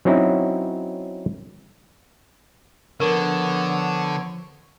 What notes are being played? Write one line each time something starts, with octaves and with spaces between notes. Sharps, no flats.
F#3 C4 C#4 D#4 E4
D3 F3 B3 A#4 C#5